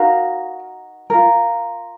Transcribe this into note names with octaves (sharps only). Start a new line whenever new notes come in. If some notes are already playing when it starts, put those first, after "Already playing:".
Already playing: D#4 F#4 A#4 F5
F4 A#4